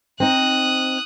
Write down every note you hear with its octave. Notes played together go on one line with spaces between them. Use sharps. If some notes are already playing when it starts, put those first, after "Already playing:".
C4 D#4 D#6 F#6